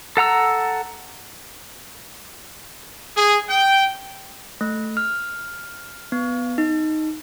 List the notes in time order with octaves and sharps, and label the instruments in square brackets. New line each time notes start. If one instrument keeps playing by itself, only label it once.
[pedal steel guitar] A4 F#5 A#5 E6
[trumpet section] G#4
G5
[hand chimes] A3
F6
B3
D#4